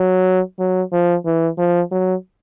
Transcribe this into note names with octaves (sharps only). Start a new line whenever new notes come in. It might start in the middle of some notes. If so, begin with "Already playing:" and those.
Already playing: F#3
F#3
F3
E3
F3
F#3